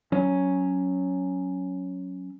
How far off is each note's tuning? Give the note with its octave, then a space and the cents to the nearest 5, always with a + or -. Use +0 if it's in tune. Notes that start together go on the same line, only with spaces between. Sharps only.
F#3 +0 C#4 +0